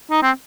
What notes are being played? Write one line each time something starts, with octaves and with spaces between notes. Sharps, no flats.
D#4
C4